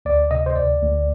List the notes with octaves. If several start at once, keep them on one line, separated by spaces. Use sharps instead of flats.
D2 D5
C3 D#5
C5
D2 D5
D2